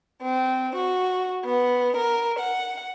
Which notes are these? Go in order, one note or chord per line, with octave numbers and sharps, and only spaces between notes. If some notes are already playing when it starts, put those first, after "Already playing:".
C4
F#4
B3
A#4
F#5